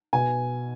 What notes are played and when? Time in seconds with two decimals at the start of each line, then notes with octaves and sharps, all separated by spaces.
0.13 B2 G#5